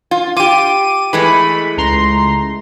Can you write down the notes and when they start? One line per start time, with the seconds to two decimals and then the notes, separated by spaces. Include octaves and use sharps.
0.11 F4
0.36 F4 G4 D6 D#7
1.13 E3 G#3 A3 B5
1.78 C#2 A#5 C6